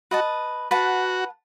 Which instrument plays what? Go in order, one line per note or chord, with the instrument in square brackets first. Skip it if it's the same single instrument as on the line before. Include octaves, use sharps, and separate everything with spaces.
[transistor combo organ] F#4 [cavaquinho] B4 D#5 A5
[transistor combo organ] F#4 [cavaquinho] B4 F#5 A5